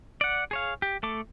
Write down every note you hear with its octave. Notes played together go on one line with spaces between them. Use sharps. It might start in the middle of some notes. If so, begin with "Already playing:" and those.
D5 F#5
G#4 C#5 F5
G4
A3 A4 D6